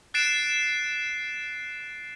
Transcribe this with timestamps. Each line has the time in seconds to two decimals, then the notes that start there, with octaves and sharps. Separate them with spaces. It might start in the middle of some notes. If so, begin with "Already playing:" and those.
0.14 F#6 A6 C7 D7 E7